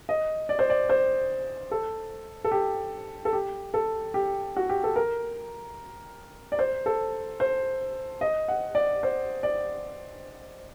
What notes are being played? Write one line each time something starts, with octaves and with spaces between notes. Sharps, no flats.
D#5
D5
C5
D5
C5
A4
A4
G4
A4
G4
A4
G4
F#4
G4
A4
A#4
D5
C5
A4
C5
D#5
F#5
D5
C5
D5